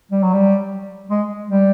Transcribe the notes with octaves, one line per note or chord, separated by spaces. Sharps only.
G3
F#3
G3
G#3
G3